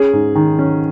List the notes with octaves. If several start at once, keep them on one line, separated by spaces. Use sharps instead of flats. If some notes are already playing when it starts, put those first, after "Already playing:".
Already playing: C#4 G#4
G#2
D#3
C#4